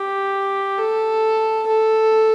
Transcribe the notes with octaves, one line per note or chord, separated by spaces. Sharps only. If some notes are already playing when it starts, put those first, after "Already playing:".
Already playing: G4
A4
A4